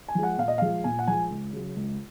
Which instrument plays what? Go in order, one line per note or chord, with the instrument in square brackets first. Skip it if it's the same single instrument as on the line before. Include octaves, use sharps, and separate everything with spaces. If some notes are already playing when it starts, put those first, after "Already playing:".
[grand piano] G#5
F3 G#3
F#5
A#2 F5
D#5
F3 G#3 F5
A#2 G#5
F#5
F3 G#3 G#5
C#2
C#3 F#3
C#2